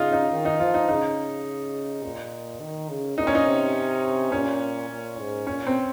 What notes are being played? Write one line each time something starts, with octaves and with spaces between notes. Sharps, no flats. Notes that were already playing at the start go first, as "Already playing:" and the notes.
Already playing: C#3 D#4 F4
D#4
D#3
D#4
F3 F4
D#4
C#3 D#4
A#2
D#3
C#3
A#2 D#4
C#4
D#4
C3
A#2 C#4
A#2
G#2
A#2 C#4
C4